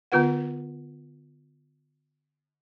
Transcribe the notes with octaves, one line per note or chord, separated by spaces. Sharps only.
D3 B3 F4 B4 F#5